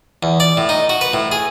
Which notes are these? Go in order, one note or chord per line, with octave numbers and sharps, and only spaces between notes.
E2
D5
A2
D#4
F#4
B4
A2
G#4